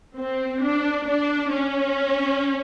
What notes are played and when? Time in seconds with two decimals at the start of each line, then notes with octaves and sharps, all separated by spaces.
0.18 C4
0.63 D4
1.07 D4
1.52 C#4